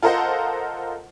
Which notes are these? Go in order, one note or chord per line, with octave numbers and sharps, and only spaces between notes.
F4 A4 A#4 C5 D#5 F#5